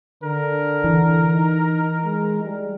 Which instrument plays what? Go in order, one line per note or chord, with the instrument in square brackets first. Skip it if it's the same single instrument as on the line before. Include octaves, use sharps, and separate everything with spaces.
[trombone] D3 [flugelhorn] A#4
[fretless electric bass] E3
[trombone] D#4
G#3
G3